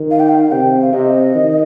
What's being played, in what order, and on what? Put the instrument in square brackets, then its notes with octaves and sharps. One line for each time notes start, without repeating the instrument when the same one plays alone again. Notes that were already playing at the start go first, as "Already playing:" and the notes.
Already playing: [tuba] D#3
[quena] F5
G5
F5
[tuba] C3 [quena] G5
[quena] F5
[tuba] C3 [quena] D#5
[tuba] D#3